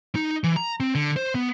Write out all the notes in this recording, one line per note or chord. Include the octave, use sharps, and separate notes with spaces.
D#4
E3
A#5
C4
D3
C5
B3